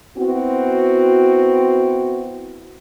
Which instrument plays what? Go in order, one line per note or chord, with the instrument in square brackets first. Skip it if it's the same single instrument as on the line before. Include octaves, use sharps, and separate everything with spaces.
[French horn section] B3 C4 E4 F#4